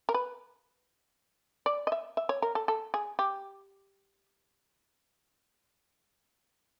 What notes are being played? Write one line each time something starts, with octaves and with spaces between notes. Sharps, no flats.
A#4
B4
D5
D#5
E5
E5
C#5
A#4
A4
A4
G#4
G4